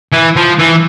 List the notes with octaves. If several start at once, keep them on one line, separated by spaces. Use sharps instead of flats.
E3
F3
E3